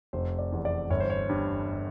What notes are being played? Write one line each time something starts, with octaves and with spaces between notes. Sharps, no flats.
F1 C5
D5
E2
D5
G1 C#5
C5
C#5
G2